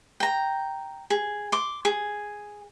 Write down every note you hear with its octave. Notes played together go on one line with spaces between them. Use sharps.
G5 A#5
G#4
C6 D6
G#4